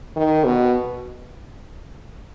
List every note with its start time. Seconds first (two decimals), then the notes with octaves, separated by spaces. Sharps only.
0.16 D#3
0.44 B2